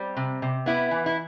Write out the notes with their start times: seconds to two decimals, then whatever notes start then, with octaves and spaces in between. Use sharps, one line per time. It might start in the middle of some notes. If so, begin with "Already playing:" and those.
Already playing: G3 C4
0.17 C3
0.42 C3
0.66 B3 E4
0.91 E3
1.06 E4